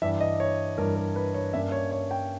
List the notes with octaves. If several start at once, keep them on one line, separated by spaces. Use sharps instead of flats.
G2 E3 G3 E5
D#5
C#5
G2 E3 G3 A#4
A#4
B4
C#5
G2 G3 A#3 C#4 E5
C#5
C#5
G5